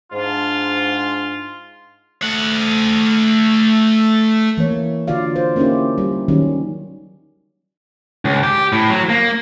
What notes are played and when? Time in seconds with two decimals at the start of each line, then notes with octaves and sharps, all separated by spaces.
0.12 G#2 D4 F4
2.23 A3 F#5
4.58 E3 A#3 C#5
5.08 D3 F4 F#4 D5 F5
5.36 C5
5.56 A#3 C#4 D#4 E4 G4
5.98 G3
6.28 D#3 F#3 G3 C#4
8.25 C#2
8.44 G4
8.73 A2
8.90 F#3
9.09 A#3